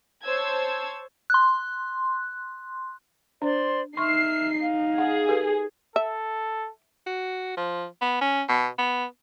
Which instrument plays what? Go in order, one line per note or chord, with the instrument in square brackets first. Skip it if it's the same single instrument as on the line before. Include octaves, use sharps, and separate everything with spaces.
[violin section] C5 C#5 A5 E6 G#6
[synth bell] C6 F#6
[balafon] D4 [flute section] C5 D5 C6
[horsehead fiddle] D#4 [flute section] E5 F6 [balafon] C6 C#6 [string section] C7
[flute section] F5
[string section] G#4 [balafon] F#5
[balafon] G4 A4 B4
[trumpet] A4 [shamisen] E5
[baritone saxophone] F#4
F3
B3
C#4
B2
B3